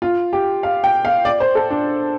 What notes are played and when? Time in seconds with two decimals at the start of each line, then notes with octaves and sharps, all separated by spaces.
0.02 F4
0.33 G4
0.63 F5
0.84 G5
1.05 F5
1.25 D5
1.40 C5
1.55 A4
1.71 D4